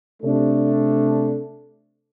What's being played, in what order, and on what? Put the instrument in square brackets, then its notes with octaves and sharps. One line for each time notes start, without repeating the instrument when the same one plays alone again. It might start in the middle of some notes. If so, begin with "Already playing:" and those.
[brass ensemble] C3 A3 D4 A4